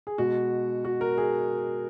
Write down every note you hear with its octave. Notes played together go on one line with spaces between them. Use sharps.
G#4
B2 G#3 F#4
F#4
A#4
G#4